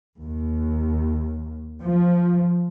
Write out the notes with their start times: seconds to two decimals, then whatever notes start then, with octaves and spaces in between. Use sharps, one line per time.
0.21 D#2
1.82 F3